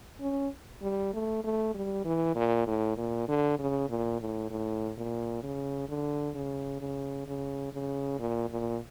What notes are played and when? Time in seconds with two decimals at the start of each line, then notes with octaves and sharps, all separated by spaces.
0.21 C#4
0.82 G3
1.14 A3
1.44 A3
1.74 G3
2.05 E3
2.35 A#2
2.67 A2
2.97 A#2
3.28 D3
3.59 C#3
3.89 A#2
4.20 A2
4.50 A2
4.97 A#2
5.43 C#3
5.89 D3
6.35 C#3
6.81 C#3
7.27 C#3
7.73 C#3
8.19 A#2
8.50 A#2